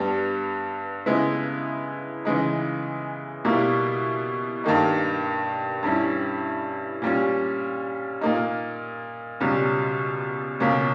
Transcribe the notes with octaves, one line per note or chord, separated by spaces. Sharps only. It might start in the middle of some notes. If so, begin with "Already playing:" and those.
Already playing: G2 G3 B3
C#3 G#3 B3 E4
C#3 E3 G#3 D#4
B2 G3 A#3 E4
G2 D#3 A#3 D#4
G2 G3 C#4 E4
A#2 G3 C#4
A#2 A#3 D#4
C#2 B2 G3 C#4
C#2 B2 A#3 C#4